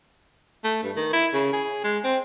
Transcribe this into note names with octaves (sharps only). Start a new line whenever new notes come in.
A3
G2
D#3
E4
C#3
G#4
G#3
C4